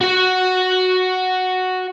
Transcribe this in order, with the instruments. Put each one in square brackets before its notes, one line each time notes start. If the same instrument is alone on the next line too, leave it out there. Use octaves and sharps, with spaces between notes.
[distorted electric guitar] F#4 F#5